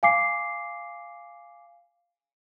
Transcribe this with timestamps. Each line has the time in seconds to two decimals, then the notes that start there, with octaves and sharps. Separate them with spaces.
0.03 F5 G#5 D6 C7